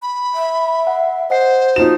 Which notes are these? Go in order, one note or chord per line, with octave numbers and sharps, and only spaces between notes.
B5
E5
F#5
C5 D#5 F#5 C7
F3 D#4 F#4 E7